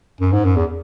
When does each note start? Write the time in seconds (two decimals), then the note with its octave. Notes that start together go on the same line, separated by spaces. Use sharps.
0.21 F#2
0.33 G#2
0.45 F#2
0.56 E2